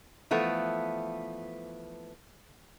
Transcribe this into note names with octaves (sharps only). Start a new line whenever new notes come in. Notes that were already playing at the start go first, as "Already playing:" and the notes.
E3 F3 A3 B3